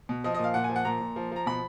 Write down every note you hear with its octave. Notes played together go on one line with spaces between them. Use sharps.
B2
F3 D#5
A#2 D#5
F5
A#2 F#5
G#5
F3
F#5
A#2 A#5
A#2
F3
F3 A#5
B2 B5